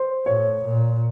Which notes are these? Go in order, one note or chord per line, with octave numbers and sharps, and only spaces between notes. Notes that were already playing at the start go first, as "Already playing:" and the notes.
Already playing: C5
A2 C#5
A#2